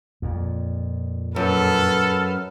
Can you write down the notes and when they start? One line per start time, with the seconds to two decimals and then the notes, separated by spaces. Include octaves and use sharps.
0.22 F2 A#2
1.36 F#2 A4 B4 F6